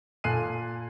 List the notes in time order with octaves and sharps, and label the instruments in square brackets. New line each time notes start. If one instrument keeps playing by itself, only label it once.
[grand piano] A#2 A4 G#5 F#6 C7 D#7